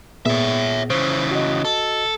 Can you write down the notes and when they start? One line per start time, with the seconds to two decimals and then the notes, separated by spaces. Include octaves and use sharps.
0.26 A#2 B3 G#4 C#5 E5
0.90 C#3 E3 C5
1.31 F#4 D#5
1.65 A4